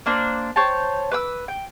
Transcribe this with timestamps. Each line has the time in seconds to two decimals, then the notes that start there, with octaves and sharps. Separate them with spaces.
0.06 A#3 D4 C5
0.56 C5 C#5 G5 A5
1.12 B4 D6 E6
1.48 G5